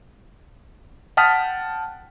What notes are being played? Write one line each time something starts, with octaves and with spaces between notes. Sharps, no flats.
F#5 G5 A5 D#6 F6 B6